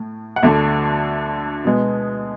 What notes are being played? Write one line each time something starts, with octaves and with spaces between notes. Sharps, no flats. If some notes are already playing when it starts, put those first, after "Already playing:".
Already playing: A2
F#5
D2 D3 A3 E5
B2 G#3 B3